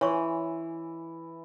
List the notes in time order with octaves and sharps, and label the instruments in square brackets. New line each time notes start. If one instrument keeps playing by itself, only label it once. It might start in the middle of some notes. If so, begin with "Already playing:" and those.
[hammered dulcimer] E3 [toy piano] C#5 C6 C#6